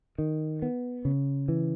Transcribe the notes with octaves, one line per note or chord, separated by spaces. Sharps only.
D#3
B3
C#3
E3